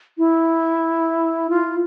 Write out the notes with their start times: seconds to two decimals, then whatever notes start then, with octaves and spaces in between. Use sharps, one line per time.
0.18 E4
1.50 F4